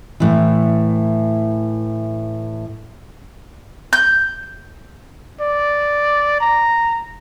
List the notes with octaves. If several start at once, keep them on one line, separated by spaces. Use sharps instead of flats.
A2 E3
G6
D5
A#5